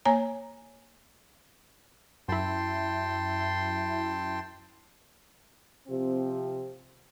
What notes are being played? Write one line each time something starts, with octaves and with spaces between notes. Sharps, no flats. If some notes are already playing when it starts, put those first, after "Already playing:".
A#3 C#5 G#5 A#5
F#2 E4 G5 A5 C6
C3 F3 C4